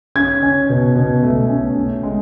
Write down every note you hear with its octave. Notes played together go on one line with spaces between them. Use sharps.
C#4 G#6
C#4
B2
B2
A3
C#4
C#4
G#3